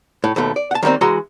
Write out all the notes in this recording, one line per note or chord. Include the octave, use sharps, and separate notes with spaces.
A2
D#2 B2 A3
D5
F#5 A5
D#3 E3 G3 A#3 C4
E3 G#3 F#4 A#5 C6